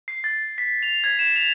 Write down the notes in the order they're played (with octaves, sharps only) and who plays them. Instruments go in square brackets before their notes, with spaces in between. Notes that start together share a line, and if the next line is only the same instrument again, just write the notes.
[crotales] C7
A6
B6
F7
G#6
E7
F7